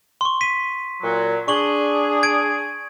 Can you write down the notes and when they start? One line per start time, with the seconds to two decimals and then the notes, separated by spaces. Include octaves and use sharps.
0.21 C6 C#6
0.41 B6 D#7
1.02 A#2 F#3
1.48 D4 G#4 C#6 F#7 G7
2.23 G#6 D7